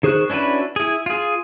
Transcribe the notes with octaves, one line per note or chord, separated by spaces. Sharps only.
D#3 G#4 C5 C#6 F#6
C#4 D4 E4 F#4 B4
E4 G#4
F4 G#4